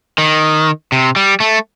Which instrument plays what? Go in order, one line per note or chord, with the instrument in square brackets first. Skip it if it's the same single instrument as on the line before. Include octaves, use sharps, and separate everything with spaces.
[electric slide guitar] D#3
C3
G3
A3